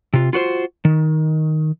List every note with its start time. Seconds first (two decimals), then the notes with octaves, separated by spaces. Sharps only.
0.13 C3 F4
0.33 F4 F#4 B4 C5
0.85 D#3